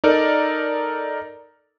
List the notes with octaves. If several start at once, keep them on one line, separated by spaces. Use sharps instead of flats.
D#4 A4 A#4 D5